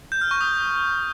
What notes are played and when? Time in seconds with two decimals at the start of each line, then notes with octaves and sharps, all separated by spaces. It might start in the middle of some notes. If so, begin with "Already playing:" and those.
0.12 G6
0.21 F6
0.31 C#6
0.41 D#6